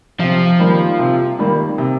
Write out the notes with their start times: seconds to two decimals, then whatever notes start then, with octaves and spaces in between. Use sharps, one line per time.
0.20 C3 F3
0.59 D#3 G3 A#3
0.99 C3
1.39 D#3 G3 A#3
1.78 C3